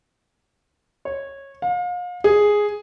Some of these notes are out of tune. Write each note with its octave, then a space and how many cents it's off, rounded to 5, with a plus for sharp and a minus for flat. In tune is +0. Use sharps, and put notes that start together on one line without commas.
C#5 -15
F5 +35
G#4 +0